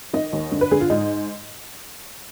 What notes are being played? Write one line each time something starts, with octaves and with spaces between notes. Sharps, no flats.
D#3 D#5
D#2
D3
B4
D3 G#4
F4
G#2 D#4